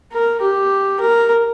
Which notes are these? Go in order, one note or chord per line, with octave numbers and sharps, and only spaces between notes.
A#4
G4
A#4